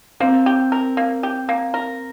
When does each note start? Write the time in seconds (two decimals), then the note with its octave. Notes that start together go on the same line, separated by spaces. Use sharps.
0.20 A#3 C4
0.46 G4
0.72 A#4
0.97 A#3
1.23 G4
1.49 A#3
1.74 A#4